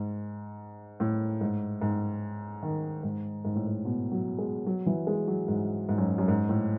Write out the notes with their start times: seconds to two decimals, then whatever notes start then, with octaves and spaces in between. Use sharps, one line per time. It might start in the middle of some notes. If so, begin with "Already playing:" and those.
Already playing: G#2
1.00 A2
1.41 G#2
1.82 G#2
2.63 D#3
3.03 G#2
3.45 G#2
3.55 A2
3.67 G#2
3.85 B2
4.11 F#3
4.38 G#3
4.66 F#3
4.86 E3
5.07 G#3
5.28 F#3
5.48 G#2
5.89 G#2
5.98 F#2
6.18 F#2
6.28 G#2
6.49 A2